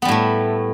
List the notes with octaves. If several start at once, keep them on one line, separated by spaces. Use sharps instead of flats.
A2 G3 A3 B3